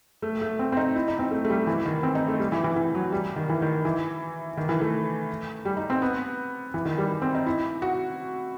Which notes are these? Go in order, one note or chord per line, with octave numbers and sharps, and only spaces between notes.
A3
A3
C4
C4
D#4
E4
D#4
C4
A3
A3
G3
E3
D#3
C4
D#4
A3
G3
E3
E3
E3
F#3
G3
D#3
E3
D#3
E3
D#3
E3
A3
G3
D#4
C4
B3
E3
D#3
G3
C4
D#4
E4
F#4